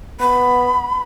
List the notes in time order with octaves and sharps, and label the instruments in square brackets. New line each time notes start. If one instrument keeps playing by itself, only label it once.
[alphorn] B3 [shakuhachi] B5